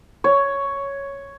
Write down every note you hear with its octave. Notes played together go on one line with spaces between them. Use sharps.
C#5